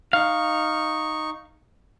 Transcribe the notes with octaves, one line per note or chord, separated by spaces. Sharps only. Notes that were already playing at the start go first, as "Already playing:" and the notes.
D#4 F5 C#6